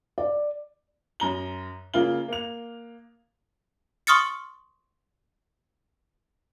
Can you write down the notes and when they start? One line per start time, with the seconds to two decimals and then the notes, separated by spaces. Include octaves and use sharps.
0.18 D5
1.20 F#2 A#5 G7
1.94 C#3 A#3 F4 G7
2.28 A#3 F7
4.07 C6 C#6 D#6 F6 A6 C#7